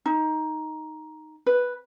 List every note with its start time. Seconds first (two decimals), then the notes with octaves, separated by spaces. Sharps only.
0.06 D#4
1.46 B4